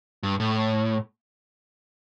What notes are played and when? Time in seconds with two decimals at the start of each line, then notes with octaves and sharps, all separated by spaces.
0.23 G2
0.40 A2